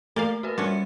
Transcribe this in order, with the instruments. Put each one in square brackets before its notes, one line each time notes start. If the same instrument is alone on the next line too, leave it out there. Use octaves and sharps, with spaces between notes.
[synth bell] A3 [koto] A#3 D5 F5
[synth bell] F#4 A#4 B4
[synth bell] G3 E5 C#7 [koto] C#4 D4